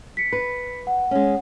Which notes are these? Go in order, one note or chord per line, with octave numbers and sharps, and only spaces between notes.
B6 C#7
B4
F#5
G#3 C#4